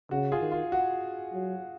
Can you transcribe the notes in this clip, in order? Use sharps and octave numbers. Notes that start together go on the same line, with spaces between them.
C#3 F#4
F4 G#4
D#3
F4
F#4
F#3